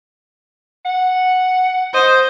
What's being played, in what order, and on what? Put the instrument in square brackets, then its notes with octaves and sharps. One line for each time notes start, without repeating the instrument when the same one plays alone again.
[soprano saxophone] F#5
[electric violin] C5 [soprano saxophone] D#5